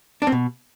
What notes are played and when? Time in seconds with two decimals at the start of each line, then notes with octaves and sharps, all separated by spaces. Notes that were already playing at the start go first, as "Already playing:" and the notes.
0.22 D4
0.27 C4
0.32 B2